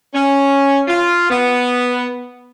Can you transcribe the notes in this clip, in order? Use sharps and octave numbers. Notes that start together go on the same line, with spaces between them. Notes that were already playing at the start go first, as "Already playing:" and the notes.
C#4
F4
B3